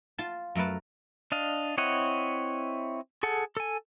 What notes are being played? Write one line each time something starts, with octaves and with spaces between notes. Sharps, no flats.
F4 A5
F#2 A3 A#4 B4 A5
D4 D#5 F5
C4 E4 C#5 D#5 F#5
G#4 A4 F#5
A4 G#5